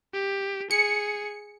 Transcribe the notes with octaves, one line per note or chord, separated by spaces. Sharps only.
G4
G#4 C#7